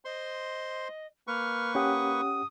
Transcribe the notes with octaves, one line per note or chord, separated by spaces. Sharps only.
C5 D#5 C6
A#3 B4 C#6 F6
C#4 G4 F#5 D#6